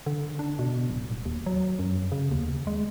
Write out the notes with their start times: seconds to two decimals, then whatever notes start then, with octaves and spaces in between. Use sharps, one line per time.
0.06 D3
0.39 D4
0.59 B2
0.90 D1
1.11 D#1
1.25 D#2
1.46 F#3
1.79 F#2
2.12 C#3
2.32 D#2
2.67 G#3